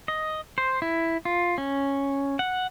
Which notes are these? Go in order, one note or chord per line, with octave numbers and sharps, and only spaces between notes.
D#5
C5
E4
F4
C#4
F#5